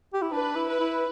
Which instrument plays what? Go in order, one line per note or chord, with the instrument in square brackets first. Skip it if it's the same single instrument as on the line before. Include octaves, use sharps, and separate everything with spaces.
[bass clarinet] G4
E4
[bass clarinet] D4 [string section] B4
[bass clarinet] E4
[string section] B4
[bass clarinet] E4